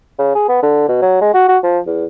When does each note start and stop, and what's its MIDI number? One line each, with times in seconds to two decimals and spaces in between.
0.19 0.35 49
0.35 0.46 68
0.48 0.59 59
0.62 0.88 50
0.88 1.00 47
1.02 1.20 54
1.21 1.33 56
1.34 1.45 66
1.48 1.58 66
1.63 1.79 53
1.87 2.05 40